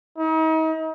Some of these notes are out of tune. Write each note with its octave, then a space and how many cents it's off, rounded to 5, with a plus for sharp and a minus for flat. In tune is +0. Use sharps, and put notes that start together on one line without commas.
D#4 +40